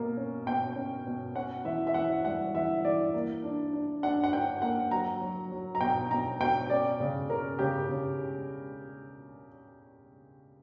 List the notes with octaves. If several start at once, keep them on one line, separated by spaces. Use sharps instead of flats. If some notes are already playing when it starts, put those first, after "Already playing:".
Already playing: B2 A#3
C#4
B2 G5
C#4
B2
C#4 F#5
E3 E5
E5
E3 F#5
G3 F#5
E3 E5
E3 D5
A#3
D4
D4
D4 F#5
F#5
D4 G5
A#3 F#5
F#3 A#5
F#3
F#3
A#5
B2 G5
B2 A#5
B2 G5
C#4 D5
C#3
C#4 A#4
C#3 G4
C#3